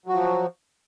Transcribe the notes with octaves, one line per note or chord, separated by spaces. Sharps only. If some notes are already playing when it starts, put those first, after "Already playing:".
F3 F#3 F#4